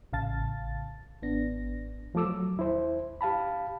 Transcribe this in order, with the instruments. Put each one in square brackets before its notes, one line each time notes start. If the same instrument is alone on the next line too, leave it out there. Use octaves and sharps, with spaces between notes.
[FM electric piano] A1 C#3 F5 A5 A6
G#1 B3 D4 A#6
[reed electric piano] F2 F3 A3 A4 D6 E6
F#3
D#2 E4 C5
G4 F5 A5 B5